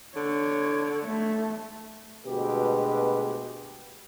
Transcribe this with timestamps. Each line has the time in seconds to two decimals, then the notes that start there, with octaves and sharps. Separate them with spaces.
0.16 D3 C#5
1.04 A3
2.27 D2 B2 G#3 G4 B4